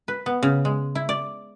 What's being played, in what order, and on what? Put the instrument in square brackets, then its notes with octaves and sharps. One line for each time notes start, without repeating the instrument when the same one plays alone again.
[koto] B4
B3
C#3
G#3
E4
D5